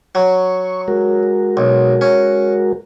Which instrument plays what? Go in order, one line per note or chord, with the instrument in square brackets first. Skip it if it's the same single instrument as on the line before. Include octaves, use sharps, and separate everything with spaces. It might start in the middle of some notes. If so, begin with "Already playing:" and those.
[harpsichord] F#3 [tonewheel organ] C#6
[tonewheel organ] G#3 F#4 A#4
[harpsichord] B1
C#4